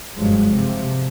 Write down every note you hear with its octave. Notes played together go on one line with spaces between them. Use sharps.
F#1 G2 A#2 F3 F#3 G#3
G#2 C3 F3